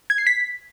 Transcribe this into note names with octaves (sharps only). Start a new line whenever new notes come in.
G#6
C7
B6